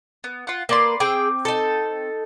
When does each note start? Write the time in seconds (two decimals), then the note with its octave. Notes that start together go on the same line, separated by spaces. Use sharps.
0.24 B3
0.47 F4 F#5
0.69 A#3 B4 D5 C6
1.00 C4 G#4 G5 D6
1.45 D#4 A4